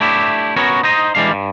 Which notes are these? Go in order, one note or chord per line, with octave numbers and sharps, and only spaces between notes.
A3 D4 E4 G4
B3 C#4 F#4 A#4 C#5
D#4 C5 D#5
E3 G3 G#3 D4 F5
G2